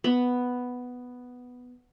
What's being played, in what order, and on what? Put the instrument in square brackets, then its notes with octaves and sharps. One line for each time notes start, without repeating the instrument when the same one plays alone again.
[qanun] B3 B5